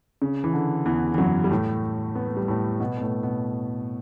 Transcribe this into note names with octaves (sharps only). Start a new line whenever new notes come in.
C#3
E3
D3
E2 E3
E3
F#2 F#3
G3
A2 A3
B3
A3
G3
A2 A3
B2 B3
B3
A2 A3
B2 B3